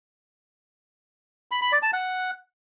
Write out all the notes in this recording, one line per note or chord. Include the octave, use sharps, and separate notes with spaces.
B5
B5
D5
A5
F#5